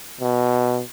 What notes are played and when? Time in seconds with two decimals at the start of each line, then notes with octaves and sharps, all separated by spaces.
0.20 B2